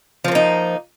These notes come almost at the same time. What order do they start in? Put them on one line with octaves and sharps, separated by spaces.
F3 C4 A#3 D#4